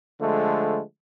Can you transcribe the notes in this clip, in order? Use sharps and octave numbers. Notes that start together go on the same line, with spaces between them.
D3 F3 G#3 A3